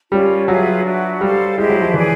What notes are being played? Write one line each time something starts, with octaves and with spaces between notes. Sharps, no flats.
G3 C#4 F4 A#4 C#5
F#3 F4 G#4 B4 E5
D4 F#4 B4 E5
G3 A4 C5 F5
G#3 E4 G4 C5 D#5
F#3
F3
E3 G#4 B4 D5